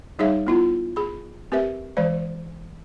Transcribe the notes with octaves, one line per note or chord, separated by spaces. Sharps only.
G3 D#4 G#4 C#5 E5 F5
B3 E4 F4
G#4 B5
C4 G4 A#4 B4 E5
E3 G#3 C5 D5